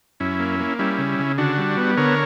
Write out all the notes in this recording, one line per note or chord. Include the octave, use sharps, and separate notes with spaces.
F#2 C#4 E4
A#3
A#3
G3 C#4 E4
C#3
C#3
D3 D4 F#4
G3
B3
D3 A#4 C#5